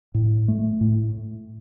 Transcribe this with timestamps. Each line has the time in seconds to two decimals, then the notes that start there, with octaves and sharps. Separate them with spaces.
0.14 A2
0.48 A3
0.81 A2